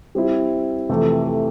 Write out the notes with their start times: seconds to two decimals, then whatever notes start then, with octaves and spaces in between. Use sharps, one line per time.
0.15 G3 C4 E4
0.89 F2 C3 E3 A3